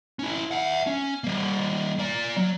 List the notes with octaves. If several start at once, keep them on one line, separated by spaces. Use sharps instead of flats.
C#4 E4
E5 F#5
C#4
G3 A#3
A#3 D5
F#3